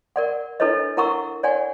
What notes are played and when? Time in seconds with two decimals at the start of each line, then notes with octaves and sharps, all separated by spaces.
0.16 A#4 D5 F#5
0.60 D4 E4 A4 B4 C#5 D#5
0.97 E4 A#4 F#5 A#5 C#6 E6
1.43 C#5 D5 F#5 G#5